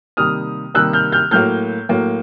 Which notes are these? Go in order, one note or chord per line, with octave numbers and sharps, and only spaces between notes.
C3 D#3 G3 A#3 D#6 F6
C3 D#3 G3 A#3 E6 F#6
F6 G6
F6 G6
A2 F#3 A#3 F6 G6
A2 F#3 A#3